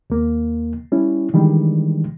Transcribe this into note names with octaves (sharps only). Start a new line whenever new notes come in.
D#2 A#3
G3 C#4 E4
D#3 E3 G3 G#3 D4